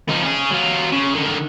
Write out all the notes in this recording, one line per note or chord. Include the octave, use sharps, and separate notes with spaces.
F3 D#4
C#4 G#4
F#3 F4
C#3
D3 D#3